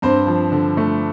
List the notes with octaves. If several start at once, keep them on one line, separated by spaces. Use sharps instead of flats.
G2 C4 C5
F3
D3
A3